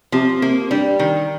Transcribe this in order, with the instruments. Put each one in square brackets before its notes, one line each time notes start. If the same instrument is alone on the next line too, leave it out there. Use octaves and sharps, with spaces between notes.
[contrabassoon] C3 [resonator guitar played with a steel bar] F3
[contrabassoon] C3 [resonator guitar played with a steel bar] A#3
[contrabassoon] G2 [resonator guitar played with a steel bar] G3
[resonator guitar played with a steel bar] D#3